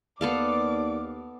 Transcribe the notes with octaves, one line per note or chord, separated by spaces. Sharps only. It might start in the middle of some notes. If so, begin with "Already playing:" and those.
D#2 B3 A4 D5 F5 D6